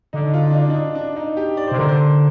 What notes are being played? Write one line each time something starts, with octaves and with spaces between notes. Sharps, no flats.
D3 D#4
F4
D4
D#4
D4
D#4
D4
D#4
G4
D5
C3 C5
D3 A#4
C5